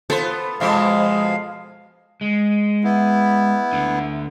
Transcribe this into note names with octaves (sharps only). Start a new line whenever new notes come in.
B3 F4 A4 C5
F2 B2 F3 G#3 F5
G#3
B3 E4
D2 D3